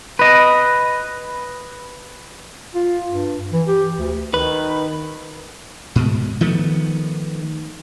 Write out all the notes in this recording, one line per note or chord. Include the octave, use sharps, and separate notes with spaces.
B4 D#5
F4
G2
E3
G4
D2
D#3 B4
G#2 B2
D#3 F3 A3 B3